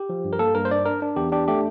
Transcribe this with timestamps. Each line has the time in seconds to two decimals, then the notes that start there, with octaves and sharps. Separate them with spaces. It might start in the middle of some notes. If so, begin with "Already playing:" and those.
Already playing: G4
0.09 F3
0.24 G2
0.33 A#4
0.39 A#3 A4
0.55 G2 A#4
0.65 C5
0.71 D4 D5
0.86 D4 A#4
1.02 D4
1.16 E2 G4
1.32 D4 G4
1.48 A3 G4